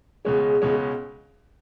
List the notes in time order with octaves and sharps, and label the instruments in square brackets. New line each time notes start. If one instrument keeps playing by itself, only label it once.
[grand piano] C#2 B2 G#3 C#4 [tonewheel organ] G#4
[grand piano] C#2 B2 G#3 C#4